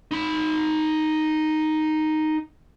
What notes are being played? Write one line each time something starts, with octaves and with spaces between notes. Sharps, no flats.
D#4 B5